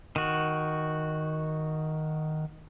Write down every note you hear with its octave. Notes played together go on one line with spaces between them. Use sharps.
D#3 F#4